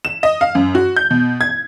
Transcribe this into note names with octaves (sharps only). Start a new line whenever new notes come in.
E7
D#5
F5
F#2
F#4
G6
B2
G#6